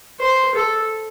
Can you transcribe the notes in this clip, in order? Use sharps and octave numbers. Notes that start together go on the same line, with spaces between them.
C5
A4